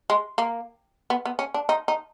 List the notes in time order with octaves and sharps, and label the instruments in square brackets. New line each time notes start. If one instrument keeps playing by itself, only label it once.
[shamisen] G#3
A#3
B3
B3
C#4
D4
D#4
D#4